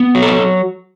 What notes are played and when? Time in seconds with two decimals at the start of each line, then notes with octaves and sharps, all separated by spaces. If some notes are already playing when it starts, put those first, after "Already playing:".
Already playing: B3
0.15 F#3
0.22 A4